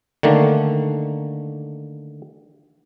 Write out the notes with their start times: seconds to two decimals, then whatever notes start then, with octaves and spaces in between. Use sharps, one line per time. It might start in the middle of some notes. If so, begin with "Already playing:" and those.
0.23 D3 D#3 A3 A#3